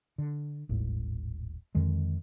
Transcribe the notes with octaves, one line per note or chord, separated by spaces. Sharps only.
D3
D#1 G#1 A2
F2 D3 D#3 G#3